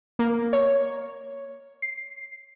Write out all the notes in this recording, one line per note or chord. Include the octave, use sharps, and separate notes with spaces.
A#3
C#5
C7